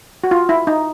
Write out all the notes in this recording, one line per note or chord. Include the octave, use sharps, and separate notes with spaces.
F#4
F4
E4
D#4